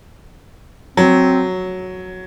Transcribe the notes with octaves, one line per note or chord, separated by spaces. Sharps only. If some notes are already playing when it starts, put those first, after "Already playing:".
F#3 C4